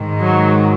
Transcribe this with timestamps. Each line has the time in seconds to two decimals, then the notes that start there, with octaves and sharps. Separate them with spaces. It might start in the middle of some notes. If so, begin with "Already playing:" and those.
Already playing: G#2 D#3
0.22 F#3